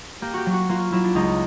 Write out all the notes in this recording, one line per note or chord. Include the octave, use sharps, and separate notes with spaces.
A#3 G4
F#4 G4
F#3
F#4
A#3 F4
F#3 E4
D4
C#2 D#4